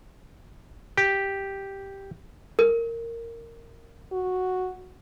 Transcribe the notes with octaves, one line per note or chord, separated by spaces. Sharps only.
G4
A#4
F#4